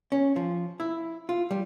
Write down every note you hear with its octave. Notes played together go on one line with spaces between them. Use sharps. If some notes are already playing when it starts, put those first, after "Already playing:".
C#4
F3
E4
F4
G3